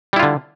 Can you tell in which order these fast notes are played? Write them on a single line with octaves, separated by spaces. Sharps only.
G3 E4 F4 D3